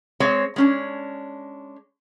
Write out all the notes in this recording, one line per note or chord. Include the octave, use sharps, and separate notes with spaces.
G#3 C4 C#5
G#3 C#4 D4